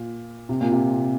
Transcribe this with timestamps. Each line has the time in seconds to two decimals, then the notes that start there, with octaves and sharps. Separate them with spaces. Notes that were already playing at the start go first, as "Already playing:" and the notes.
Already playing: A#2
0.49 C3
0.61 A#2
0.72 C3